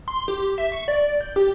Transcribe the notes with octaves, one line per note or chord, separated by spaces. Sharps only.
C6
G4
E5
C#6
D5
G6
G4